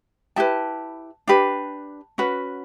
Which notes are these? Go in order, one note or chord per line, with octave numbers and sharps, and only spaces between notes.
E4 G4 B4 A5
D4 G4 B4
C#4 F#4 B4